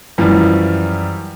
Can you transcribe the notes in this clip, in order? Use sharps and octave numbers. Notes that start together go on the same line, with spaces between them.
F#2 E3 F3 G3